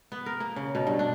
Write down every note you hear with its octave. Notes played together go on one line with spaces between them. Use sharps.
B3
A#4
A#3
C#3
B2
G2
D4